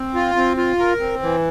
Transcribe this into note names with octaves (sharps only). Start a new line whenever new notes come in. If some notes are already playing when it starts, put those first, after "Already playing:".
Already playing: C4
F4
C4
F4
A#4
C4
E3